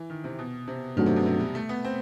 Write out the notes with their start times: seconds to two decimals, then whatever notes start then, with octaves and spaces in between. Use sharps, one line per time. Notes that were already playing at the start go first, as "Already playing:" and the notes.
Already playing: E3
0.10 D#3
0.24 C3
0.39 B2
0.68 C3
0.96 G2 D#3 F#3 A3 C4
1.06 C3
1.16 B2
1.26 C3
1.40 G3
1.55 A3
1.69 B3
1.84 C4